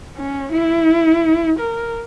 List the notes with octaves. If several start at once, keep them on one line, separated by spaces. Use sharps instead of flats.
C#4
E4
A#4